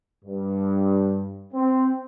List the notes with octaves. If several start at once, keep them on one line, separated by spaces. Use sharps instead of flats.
G2
C4